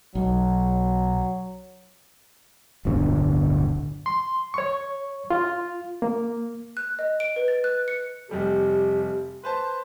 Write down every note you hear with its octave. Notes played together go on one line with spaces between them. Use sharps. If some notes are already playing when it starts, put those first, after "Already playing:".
B1 F#3
D1 G1 B2 D3
C6
C#5 C#6
F4
A#3
F#6
D#5
D7
B4
A6
F#6
C#7
F1 G3 A3 G4
B4 C5 A5 C6